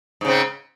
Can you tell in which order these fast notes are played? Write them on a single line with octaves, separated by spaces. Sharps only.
G#2 C#3 C4